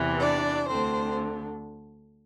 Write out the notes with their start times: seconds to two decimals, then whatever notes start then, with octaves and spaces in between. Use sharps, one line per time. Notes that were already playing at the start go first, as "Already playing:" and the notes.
Already playing: E2 C3 E3
0.20 D4 D5
0.68 D2 D3 C4 C5